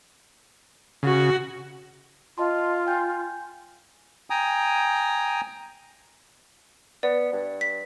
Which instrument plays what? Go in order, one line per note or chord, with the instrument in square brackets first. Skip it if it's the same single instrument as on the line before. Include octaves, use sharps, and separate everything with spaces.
[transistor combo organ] C#3 [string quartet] F#4
[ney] F4 [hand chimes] D#5 A5 C6
[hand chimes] G5 G#5 G6
[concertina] G5 G#5 A#5 D#6
[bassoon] B3 [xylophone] D5
[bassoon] G2
[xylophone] B6